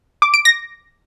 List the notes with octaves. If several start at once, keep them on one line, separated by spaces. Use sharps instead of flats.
D6
D7
A#6